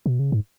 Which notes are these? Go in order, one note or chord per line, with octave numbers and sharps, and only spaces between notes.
B2
C#3
G#2